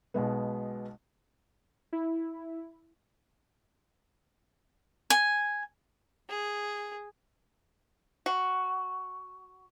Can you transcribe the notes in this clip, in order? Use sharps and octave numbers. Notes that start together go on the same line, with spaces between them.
B1 B2 G#3 B3
E4
G#5
G#4
F#4